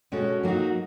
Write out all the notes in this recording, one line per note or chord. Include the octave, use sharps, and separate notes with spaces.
B2 G#3 C#4 F#4 A4
F#3 A#3 D#4 F#4